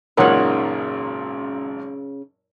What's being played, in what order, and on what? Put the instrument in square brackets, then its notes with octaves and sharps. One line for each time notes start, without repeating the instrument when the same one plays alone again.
[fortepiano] G#1 F#2 A#2 [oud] C#3 D#4 [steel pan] A#4 C#5 F#5